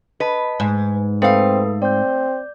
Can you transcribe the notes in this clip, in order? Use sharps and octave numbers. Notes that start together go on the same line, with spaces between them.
B4 D#5 A5
G#2 G#5
A3 C4 A4 B4 F5 D#6
C4 D5 G6